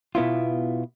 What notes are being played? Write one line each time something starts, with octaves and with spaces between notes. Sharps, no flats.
B2 B3 E4 F4